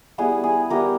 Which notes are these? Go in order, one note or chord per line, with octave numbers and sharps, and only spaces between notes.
G3 B3 E4 G#4
G#4
G3 B3 E4 G4 A#4